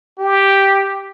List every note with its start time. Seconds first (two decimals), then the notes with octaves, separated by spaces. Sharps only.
0.19 G4